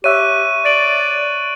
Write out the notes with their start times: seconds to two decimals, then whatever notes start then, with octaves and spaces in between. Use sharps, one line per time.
0.04 G4 C#5 E5 C#6 F#6 D#7
0.65 D5 A6 D7 F#7